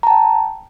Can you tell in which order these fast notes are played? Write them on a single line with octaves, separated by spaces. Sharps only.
A#5 A5 G5